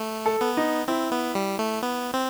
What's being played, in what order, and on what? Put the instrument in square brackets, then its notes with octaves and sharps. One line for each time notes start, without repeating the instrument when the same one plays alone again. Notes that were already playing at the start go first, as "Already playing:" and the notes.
Already playing: [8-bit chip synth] A3
[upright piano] A4
[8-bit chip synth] B3
[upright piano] D#4
[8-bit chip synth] C4 [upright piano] E4
[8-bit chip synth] B3
G3
A3
B3
C4